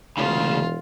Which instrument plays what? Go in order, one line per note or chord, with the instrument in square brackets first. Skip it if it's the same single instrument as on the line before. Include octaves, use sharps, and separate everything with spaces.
[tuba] E1 [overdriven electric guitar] D2 C#3 [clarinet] E3 [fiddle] F4